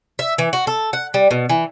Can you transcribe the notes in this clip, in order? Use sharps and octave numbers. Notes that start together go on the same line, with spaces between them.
E5
E3
F#4
A4
F#5
G3
B2
E3